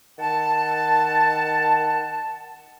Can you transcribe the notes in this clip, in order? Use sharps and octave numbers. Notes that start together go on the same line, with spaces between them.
D#3 F#5 A5